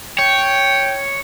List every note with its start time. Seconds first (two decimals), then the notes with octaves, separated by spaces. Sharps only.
0.19 C#5 G5